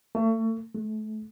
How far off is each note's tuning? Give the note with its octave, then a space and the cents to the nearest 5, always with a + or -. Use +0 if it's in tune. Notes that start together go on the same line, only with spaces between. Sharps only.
A3 +35
A3 -30